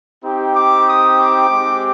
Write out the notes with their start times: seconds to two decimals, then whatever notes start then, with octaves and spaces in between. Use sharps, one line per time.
0.25 C4 D#4 G4
0.56 D6
0.87 D#6
1.18 D6
1.50 G#3 C4 G4